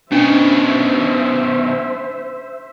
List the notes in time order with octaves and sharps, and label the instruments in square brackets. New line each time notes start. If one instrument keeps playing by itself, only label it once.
[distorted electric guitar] B2 D#3 [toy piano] C#4 D4 G5 [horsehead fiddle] C5 E5